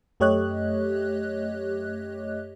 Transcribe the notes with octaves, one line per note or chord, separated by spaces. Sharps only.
F#2 A3 G4 C#5 D#5 F#6